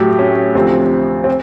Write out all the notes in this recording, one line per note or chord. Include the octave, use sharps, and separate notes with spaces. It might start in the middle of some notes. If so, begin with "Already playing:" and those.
Already playing: A2 F#3 A3 G4
C#4
D2 C3 F3 C4
C4